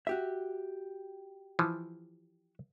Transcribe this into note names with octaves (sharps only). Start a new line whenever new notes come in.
F#4 G4 E5
E3 F3